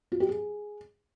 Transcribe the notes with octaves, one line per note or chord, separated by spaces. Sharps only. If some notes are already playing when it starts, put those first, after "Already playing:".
F4
G4
G#4